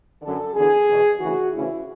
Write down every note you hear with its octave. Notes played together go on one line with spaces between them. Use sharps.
F#2 D3 A4
E2 D3 G#4
E2 B2
D2 C#3 E3 F#4
D2 C#3 E3 E4